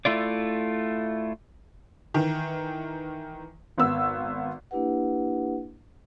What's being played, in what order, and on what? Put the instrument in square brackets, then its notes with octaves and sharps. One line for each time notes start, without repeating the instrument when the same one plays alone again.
[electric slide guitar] A3 E4 F4 D5
[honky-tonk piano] D#3 E3
G#1 B3 E6
[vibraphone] A#3 D4 E4 G4 B4 F#5